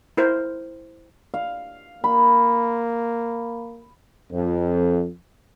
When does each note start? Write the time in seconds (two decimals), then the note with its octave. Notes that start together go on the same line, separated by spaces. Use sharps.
0.17 E4 A#4 C5
1.34 F5
2.04 A#3 B5
4.31 F2